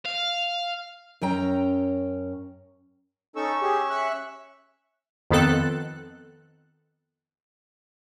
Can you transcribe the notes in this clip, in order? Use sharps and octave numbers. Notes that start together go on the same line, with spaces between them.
F5
F#2 C#4 G5 A#5
C#4 D#4 A4 C#6 E6
G4 G#4
E5 F#6
F2 D#3 B3 C4 A4 F#6